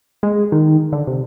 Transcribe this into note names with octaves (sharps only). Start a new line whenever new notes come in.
G#3
D#3
D3
C3